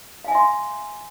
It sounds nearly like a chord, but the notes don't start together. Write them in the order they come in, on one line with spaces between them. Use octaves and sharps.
F5 G#5 E5 C6